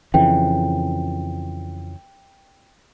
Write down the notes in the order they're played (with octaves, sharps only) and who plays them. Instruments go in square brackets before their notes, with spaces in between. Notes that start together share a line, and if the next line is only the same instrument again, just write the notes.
[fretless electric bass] F2 C#3 E3 [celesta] G5